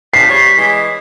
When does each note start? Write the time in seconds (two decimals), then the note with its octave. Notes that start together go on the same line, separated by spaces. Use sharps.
0.14 E2 F3 D4 B6 C7
0.28 G3 C#5
0.56 E3 G#3